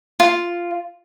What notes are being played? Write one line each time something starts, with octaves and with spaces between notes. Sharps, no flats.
F4